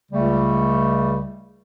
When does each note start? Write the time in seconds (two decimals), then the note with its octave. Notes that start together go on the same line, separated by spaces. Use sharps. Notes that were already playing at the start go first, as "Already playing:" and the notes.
0.12 C#2 C#3 G3 A3